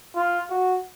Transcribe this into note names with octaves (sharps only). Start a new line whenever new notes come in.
F4
F#4